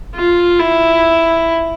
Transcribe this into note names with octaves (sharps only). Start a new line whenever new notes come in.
F4
E4